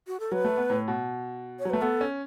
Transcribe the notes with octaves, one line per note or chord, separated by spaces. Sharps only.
F#4
A4
F#3 B4
A3
B3
A2
B2
C#5
F#3
A3 B4
B3 A4
C#4